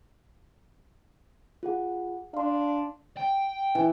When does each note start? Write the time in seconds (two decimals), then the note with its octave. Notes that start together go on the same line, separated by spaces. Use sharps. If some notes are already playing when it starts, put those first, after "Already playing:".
1.63 F4 G#4 F#5
2.34 D4 F5 C6
3.17 G5
3.75 E3